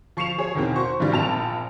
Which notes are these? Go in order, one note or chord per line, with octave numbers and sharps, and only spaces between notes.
F3 C#6 C7 C#7 E7 F7
G#4 C#5
E2 B2 D#3 A#3 C4
F#4 C5 C#6
G2 D#3 E3 G3
A#1 A#2 C4 A5 B5 F7